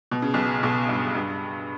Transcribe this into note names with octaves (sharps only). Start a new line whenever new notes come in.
B2
C#3
B1 B2
B1 B2
G2
G2